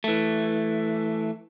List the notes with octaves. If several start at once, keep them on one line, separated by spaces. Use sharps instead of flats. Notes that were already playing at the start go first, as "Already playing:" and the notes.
E3 A3